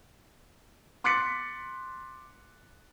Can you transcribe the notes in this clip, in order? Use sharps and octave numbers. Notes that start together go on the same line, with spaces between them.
C6 D6 F#6 A6 B6 C#7